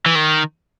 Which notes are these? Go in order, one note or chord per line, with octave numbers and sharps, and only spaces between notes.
E3
D#3